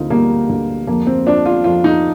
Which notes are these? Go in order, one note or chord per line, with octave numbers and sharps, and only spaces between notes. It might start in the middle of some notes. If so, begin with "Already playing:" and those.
Already playing: D2 D3 A#3 C4 D#4 F4
G3 A#3
D2
F2 A#3
C4
F3 D4
F4
F2 F4
D#4